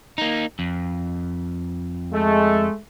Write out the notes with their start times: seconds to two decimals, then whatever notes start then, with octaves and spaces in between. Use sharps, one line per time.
0.18 A#3 D#4
0.59 F2
2.13 G#3 A3